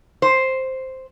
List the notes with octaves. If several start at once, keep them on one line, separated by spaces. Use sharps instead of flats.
C5